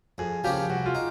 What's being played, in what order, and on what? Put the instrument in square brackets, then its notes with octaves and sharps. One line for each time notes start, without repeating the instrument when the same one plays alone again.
[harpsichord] F2 [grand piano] G#4
[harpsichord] C#3 F3 A#3 C#4 [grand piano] G4
[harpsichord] C2 [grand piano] F#4
[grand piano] F4
[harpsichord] D#4